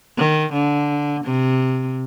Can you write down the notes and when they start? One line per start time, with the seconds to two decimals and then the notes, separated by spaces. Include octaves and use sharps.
0.17 D#3
0.53 D3
1.24 C3